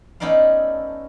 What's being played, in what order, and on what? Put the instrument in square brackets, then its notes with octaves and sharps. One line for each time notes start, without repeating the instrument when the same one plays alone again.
[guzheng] A3 B3 C#4 D#4 D5 F5